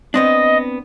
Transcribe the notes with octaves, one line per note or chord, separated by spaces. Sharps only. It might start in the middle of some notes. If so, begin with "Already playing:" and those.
B3 C4 D4 D#5